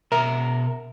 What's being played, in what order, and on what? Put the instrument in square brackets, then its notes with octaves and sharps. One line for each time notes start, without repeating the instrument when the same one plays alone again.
[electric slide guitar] B2 E5 A#5 [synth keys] A#4